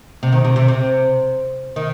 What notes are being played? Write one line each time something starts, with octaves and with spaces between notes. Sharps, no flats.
C3
D#3
C3
C3
C3
D#3